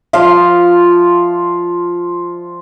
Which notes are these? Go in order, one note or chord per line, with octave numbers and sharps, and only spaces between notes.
F3 F4 F5